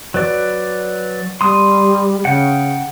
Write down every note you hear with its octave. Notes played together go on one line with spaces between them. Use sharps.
F#3 B4 D5
G3 C6 D#6
C#3 F#5 G5